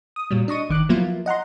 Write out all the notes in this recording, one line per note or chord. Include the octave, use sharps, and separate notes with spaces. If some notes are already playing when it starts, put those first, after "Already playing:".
D#6
A#2 F#3 G3
D4 D#5 C#6 D#7
G1 D#3 D6 F#6
F3 F#3 A#3 B3 E4 F4
D#5 F#5 A#5 C6